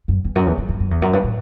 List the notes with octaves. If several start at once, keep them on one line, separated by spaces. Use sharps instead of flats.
F#2
E2
F#2
E2
F#2
G2
F#2
E2
F#2
G2
A2